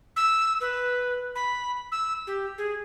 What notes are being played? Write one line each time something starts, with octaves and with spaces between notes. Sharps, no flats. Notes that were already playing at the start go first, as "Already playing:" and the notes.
E6
B4
B5
E6
G4
G#4